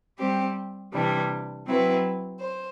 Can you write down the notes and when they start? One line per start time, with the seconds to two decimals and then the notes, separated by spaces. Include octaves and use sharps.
0.18 G3 C4 G4
0.92 C3 E3 G3 D4
1.67 F#3 C4 E4 B4
2.40 C5